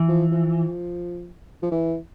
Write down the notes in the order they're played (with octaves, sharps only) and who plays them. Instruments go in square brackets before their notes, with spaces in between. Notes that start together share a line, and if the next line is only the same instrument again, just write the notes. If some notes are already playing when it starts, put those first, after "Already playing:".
Already playing: [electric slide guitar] E3
[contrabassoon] F3
F3
F3
E3